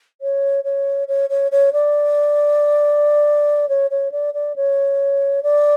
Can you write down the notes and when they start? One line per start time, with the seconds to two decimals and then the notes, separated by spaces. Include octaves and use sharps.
0.21 C#5
0.64 C#5
1.08 C#5
1.29 C#5
1.52 C#5
1.73 D5
3.69 C#5
3.90 C#5
4.12 D5
4.34 D5
4.56 C#5
5.43 D5